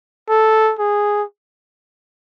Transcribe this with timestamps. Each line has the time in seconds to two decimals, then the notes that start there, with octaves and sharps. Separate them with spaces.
0.29 A4
0.79 G#4